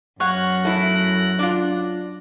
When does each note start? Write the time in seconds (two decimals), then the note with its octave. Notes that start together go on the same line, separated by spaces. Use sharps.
0.20 F#2 C#5 F5 F#5 F#6 A#6
0.65 A3 E4
1.39 D4 F4